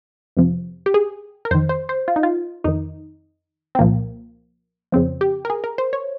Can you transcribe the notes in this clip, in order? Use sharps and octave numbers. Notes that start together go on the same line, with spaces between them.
F2 C3 F3
G4
G#4
A#4
F2 D#3 C5
C5
C5
F4
D#4
F4
F2 D#3 D#4
C4
C2 A#2 F3 A#3
F2 C#3 F3 C4
G4
A#4
G#4
A#4
C5
C#5